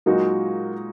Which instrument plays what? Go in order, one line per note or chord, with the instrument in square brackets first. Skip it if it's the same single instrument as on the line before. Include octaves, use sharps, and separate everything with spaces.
[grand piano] A#2 G#3 D#4 F#4 [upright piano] F#3 A#3